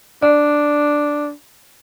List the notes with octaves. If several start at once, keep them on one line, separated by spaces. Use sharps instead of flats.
D4 D5